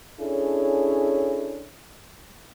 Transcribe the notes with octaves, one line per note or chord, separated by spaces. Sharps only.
C#4 D4 E4 G#4 A4 C#5